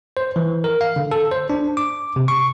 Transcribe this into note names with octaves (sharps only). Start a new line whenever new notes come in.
C5
E3
A#4
F5
D3
A4
C5
D4
D6
C3
C#6